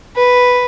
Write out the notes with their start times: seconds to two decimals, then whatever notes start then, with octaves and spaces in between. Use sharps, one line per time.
0.16 B4